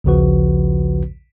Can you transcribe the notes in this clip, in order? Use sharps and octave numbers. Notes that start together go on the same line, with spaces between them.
A#1 D#2 C#3 F3 F#4 B4